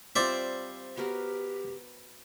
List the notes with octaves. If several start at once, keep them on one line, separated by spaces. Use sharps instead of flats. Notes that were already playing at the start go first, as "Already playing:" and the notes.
G3 C4 F4 C5 D5 E5
B3 F#4 G4 A#4